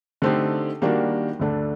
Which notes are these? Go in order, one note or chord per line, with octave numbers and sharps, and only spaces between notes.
D3 A3 C4 D#4 G4
D#3 G3 A#3 D4 F#4
D2 D3 A3 D4 A4